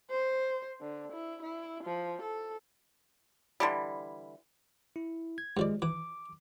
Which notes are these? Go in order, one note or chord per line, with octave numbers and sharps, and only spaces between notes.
C5
D3
E4
E4
F3
A4
D3 E3 G3
E4
G#6
G2 F3 G#3 D5
E3 D6